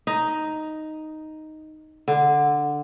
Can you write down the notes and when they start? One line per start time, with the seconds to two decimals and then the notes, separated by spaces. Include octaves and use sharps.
0.07 D#4
2.08 D3